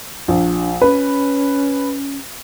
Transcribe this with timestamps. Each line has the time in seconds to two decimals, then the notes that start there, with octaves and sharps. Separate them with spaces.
0.28 A#1 D4
0.82 C#4 B4